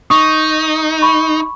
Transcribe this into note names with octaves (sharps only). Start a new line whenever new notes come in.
D#4 C#6 D#6
B5 C#6